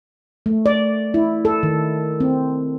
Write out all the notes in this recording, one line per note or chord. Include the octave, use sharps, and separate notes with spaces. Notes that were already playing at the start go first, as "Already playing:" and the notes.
A3
D5
E4
A4
D#3
C4